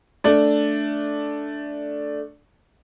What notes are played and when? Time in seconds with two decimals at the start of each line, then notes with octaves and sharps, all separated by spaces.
0.24 A3 D4